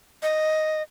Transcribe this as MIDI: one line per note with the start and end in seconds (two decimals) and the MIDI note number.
0.23 0.82 75